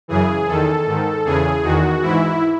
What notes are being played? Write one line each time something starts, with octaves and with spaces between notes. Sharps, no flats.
F#2 C#3 E3 G#4
E2 D#3 A4
G#2 D#3
E2 C#3 E3 G#4
E2 D#3 F#4
G#2 E3 E4